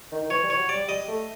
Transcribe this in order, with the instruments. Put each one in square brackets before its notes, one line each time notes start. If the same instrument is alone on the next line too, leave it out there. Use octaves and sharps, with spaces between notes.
[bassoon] D#3
D#3
[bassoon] E3 [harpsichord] C#5
[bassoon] G3
[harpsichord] C#5
[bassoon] F#3
[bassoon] G3 [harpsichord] D5
[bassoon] G3 [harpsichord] D#5
[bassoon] A3